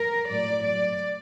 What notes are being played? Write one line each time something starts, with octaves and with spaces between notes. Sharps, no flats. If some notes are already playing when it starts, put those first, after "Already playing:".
Already playing: A#4
A2 F#3 D5
D5